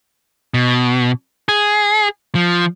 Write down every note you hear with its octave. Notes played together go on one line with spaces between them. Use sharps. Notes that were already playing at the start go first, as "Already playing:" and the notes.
B2
G#4
F3